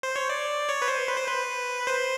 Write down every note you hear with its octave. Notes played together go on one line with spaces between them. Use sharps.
C5
C#5
D5
C#5
B4
C5
B4
C5
B4
C5